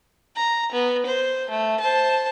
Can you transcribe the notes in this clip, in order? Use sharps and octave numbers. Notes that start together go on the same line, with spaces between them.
A#5
B3
C5
A3
C5 A5